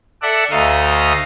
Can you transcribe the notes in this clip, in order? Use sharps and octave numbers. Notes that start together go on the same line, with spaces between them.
A4 D5 E5 F#5
D2 A3 D#5 F5 A#5